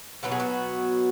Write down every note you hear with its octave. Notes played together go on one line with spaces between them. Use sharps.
B2 F#3 B3 D#4 F#4
G#4
F#4